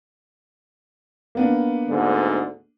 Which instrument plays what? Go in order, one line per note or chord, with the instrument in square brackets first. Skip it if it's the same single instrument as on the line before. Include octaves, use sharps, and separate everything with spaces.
[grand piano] A#3 B3 D4
[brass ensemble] D2 G#2 D3